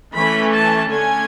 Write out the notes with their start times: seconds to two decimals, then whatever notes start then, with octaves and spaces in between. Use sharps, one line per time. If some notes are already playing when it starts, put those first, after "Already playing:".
0.14 E3 A3 C#4 B5
0.52 A5
0.91 D3 A3 C#4 G#5